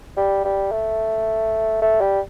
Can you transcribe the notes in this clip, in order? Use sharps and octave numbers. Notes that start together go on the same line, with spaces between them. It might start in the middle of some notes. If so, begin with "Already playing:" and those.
G3
G3
A3
A3
G3